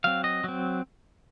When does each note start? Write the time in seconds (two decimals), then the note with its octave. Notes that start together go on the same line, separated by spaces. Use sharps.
0.04 F#3 C4 F5
0.24 D#5
0.44 F#3 C4